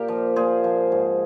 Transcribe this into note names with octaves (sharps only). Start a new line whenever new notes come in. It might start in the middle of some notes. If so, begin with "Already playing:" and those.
Already playing: A#2 G4 A#4
F3
A#2 G#4 C5
F3
G#2